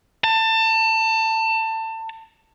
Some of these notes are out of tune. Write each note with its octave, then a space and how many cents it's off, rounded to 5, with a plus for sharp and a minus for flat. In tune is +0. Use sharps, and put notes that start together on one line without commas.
A5 +25